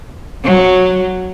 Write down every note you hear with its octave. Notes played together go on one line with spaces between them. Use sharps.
F#3